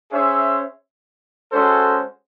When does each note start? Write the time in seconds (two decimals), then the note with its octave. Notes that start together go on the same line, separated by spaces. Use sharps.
0.11 C#4 G#4 C5 E5
1.51 G#3 C#4 F#4 A4 C5